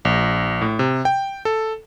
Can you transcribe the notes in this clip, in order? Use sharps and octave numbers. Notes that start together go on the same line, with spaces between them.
A#1
A2
C3
G5
A4